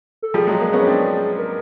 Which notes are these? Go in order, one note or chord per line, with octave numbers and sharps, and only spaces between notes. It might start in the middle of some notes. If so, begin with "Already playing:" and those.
A4
F3 G3 G#4
F#3 G#3
G#3 A#3
B3 C#4
C4 D4
A#4